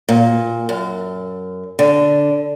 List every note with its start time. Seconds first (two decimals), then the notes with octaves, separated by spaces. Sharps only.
0.09 A#2
0.69 F#2
1.79 D3